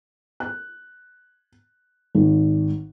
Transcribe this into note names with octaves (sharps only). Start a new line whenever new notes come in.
F#6
G#1